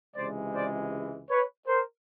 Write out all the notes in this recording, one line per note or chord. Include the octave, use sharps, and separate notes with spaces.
C#2 C3 E3 G#3 C5 D5
C5 D5
B4 C#5
A#4 C5